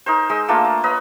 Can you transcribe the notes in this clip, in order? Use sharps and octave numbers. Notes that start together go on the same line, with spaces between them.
D#4 A#4 C5
G#3 D#5 E6
A3 A#3 D4 F4
A#5
B4 C#5 D#5 A#5